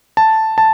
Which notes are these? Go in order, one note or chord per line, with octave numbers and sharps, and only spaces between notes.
A5
A5